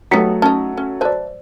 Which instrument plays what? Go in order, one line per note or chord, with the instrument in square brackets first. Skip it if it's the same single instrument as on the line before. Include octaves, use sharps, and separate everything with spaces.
[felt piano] F#3 A3 [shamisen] B3 D#4 G4 [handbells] A#5 B6 C#7
[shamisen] C#4 D#4 [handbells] A5
[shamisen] C#4
[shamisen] B4 E5 A5 [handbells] C5 D5